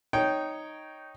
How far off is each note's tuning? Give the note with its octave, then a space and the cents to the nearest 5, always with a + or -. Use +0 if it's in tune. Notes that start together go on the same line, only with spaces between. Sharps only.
D#4 -5 C#5 +0 G5 -10